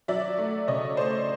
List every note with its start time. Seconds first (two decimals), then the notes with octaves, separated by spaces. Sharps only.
0.08 F#3 D5 E5
0.38 A3
0.68 C#3 C#5 D#5
0.97 A3 C5 D5